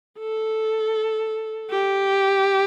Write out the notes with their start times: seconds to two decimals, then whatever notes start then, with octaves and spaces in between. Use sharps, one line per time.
0.19 A4
1.70 G4